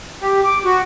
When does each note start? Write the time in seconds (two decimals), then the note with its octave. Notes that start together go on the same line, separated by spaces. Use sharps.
0.22 G4
0.43 D6
0.65 F#4